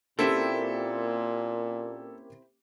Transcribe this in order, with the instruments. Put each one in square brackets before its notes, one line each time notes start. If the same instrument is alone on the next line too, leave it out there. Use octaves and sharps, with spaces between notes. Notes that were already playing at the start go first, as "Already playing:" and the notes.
[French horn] A#2 [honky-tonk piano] A#3 C#4 G4 [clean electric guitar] C4 E4 E5 [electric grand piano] A4